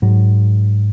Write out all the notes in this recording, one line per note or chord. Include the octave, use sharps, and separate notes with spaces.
G#2 F#3